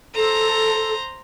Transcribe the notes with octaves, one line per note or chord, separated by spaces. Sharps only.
A4 C5 A#5